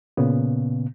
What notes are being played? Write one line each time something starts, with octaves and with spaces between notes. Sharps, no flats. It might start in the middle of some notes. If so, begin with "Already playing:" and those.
A#2 C#3 B3